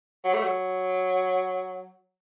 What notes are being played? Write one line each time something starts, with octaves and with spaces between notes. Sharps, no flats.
F#3
A3
F#3